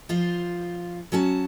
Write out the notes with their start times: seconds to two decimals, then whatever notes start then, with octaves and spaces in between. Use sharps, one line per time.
0.09 F3 F4 C5
1.12 F#3 C#4 F#4 A5